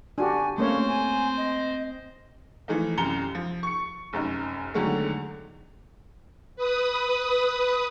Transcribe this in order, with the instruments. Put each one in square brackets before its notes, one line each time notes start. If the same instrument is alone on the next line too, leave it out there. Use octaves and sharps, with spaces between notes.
[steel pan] D4 F#4 G4 [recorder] G#5
[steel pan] A3 A#3 C#5 [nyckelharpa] C4 C5 [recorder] C#4
[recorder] G#5
D#5
[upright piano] E3 F3 A3 D#4
C2 F#2 A#5 C#7 G7
F3
C#6 C#7
F1 F#2 D#4
E2 D3 D#3 F#3 G#3 A3
[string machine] B4 D#6